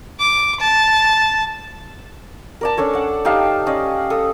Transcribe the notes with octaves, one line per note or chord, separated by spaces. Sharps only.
D6
A5
A#4 D5 A5
C#4 D4 A4 C#5
D5 F#5
D#4 G4 F5 A5
C#4 D5 D#5
A4 D#6